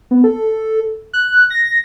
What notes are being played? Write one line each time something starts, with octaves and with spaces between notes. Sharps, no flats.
B3
A4
F#6
A#6